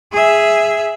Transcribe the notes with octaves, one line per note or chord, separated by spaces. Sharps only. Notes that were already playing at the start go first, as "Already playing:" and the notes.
G#4 E5